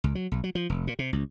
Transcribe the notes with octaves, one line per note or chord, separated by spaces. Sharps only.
C#2
F#3
B1
F#3
F3
F1
A#2
C3
C#2